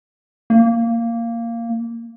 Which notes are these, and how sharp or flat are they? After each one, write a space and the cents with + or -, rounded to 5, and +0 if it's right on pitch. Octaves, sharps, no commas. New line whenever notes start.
A#3 -10